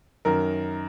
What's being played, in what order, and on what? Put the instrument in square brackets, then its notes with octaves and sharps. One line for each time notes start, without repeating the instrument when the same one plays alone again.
[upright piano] F#2 D#3 A#4